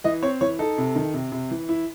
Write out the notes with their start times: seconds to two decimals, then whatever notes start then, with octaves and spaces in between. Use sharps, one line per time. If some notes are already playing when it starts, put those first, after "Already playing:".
0.04 E3 D#5
0.22 C4 C#5
0.41 E3 C#5
0.59 D#4 A4
0.78 C3
0.96 D#3
1.14 C3
1.32 C3
1.51 E3
1.69 E4